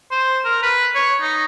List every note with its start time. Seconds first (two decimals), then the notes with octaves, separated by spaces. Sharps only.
0.11 C5
0.45 A#4
0.62 B4
0.95 C#5
1.21 D#4